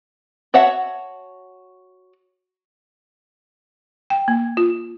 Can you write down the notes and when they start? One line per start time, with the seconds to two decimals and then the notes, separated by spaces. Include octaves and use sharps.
0.54 F#4 C#5 E5 F#5 A5
4.10 G5
4.28 A#3
4.57 F4